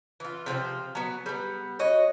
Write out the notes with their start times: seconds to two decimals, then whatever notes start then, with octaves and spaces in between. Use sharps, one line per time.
0.20 E3 F4
0.46 C3 F3 F4 C5
0.95 F#3 B3
1.26 G3 B3
1.79 F#4 C#5 D#5